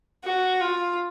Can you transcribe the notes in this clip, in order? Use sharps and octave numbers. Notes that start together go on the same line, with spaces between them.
F#4
F4